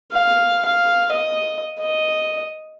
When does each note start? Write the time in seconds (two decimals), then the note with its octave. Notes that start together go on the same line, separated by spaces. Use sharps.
0.12 F5
0.65 F5
1.12 D#5
1.80 D#5